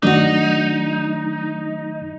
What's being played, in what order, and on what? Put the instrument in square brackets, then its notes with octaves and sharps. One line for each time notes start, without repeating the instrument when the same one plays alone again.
[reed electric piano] D#3 F#3 A3 [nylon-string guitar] D4 F#4 [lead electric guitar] D#4